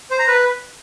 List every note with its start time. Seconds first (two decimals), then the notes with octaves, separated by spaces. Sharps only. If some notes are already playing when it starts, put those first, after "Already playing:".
0.11 C5
0.19 A#5
0.28 B4